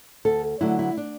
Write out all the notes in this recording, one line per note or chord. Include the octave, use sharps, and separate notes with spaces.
D2 A4
D3 F#3 A3 E4
E4
D4